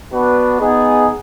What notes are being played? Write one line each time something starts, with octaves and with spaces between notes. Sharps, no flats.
B3 D4 F#4 B4
B3 D#4 G#4